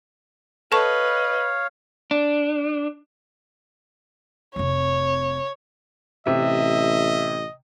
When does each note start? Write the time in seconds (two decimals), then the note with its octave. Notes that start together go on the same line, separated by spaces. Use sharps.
0.72 A4 B4 C#5 D#5 F5 A5 C#6
2.11 D4
4.56 F1 C4 C#5
6.27 A1 C3 D#5 E5